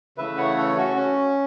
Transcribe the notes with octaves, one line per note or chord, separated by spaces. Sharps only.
C#3 E3 A3 B4 E5
C#5 F#5
A4 C#5
C#4 F#4
C#4